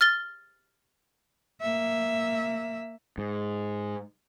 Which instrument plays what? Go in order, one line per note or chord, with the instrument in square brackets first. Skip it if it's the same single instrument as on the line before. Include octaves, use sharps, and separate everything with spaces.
[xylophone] F6 A6 G7
[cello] A#3 E5
[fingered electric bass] G#2